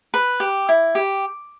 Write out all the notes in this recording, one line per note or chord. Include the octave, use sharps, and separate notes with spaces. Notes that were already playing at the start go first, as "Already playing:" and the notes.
B4
G4
E4
G4